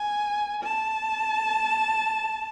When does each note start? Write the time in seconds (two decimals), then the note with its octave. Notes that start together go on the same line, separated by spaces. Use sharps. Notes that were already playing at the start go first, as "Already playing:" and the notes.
Already playing: G#5
0.63 A5